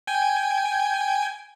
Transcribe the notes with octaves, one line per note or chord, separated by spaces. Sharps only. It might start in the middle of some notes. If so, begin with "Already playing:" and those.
G5 G#5